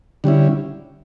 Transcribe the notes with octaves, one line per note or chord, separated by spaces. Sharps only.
D3 G3 C#4 E4